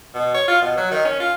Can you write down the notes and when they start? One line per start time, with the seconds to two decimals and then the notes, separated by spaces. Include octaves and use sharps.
0.15 B2
0.35 C#5
0.48 F4
0.62 B2
0.77 F#3
0.91 D#3
1.05 C#4
1.20 F4